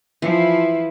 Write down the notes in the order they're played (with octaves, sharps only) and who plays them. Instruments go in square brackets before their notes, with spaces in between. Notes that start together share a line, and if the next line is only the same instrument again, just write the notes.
[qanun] E3 [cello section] F3 E4